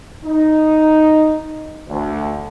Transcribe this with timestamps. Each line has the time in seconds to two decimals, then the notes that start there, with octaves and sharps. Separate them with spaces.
0.25 D#4
1.89 D2